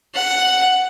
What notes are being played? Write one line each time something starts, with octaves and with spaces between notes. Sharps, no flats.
F#5